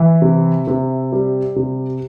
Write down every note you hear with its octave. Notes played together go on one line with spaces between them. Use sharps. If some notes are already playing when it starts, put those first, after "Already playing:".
Already playing: E3 E5
C3
C3
G3
C3